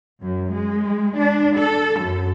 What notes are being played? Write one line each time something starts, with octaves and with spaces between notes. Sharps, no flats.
F#2
G#3
D4
A4
F#2